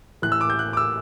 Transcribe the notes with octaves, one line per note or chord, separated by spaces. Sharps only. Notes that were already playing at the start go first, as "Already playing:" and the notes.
A2 E3 A3 F#6
E6
D6
G6
F#6
D6
E6